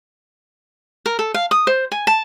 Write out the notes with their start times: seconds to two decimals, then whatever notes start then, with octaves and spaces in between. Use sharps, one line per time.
1.06 A#4
1.19 A4
1.34 F5
1.51 D#6
1.67 C5
1.92 G#5
2.07 A5